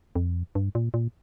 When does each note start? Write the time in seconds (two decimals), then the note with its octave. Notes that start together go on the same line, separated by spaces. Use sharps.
0.16 F2
0.55 G2
0.75 A#2
0.94 A#2